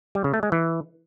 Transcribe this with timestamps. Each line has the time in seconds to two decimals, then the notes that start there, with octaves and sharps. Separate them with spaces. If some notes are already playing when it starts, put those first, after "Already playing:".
0.15 G3
0.24 C#3
0.34 A3
0.43 G#3
0.52 E3